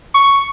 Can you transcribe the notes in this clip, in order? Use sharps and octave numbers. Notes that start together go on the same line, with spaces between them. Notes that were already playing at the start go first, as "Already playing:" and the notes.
C#6